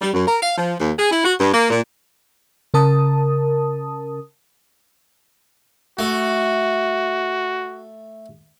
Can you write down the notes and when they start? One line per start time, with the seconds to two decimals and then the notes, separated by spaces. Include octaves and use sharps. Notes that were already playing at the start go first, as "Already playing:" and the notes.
0.02 G3
0.14 F#2
0.28 A#4
0.42 F5
0.58 F3
0.80 D#2
0.99 G#4
1.11 E4
1.25 F#4
1.40 G2
1.53 A#3
1.71 A#2
2.74 C#3 A#4 A5 D#6
5.99 A3 F#4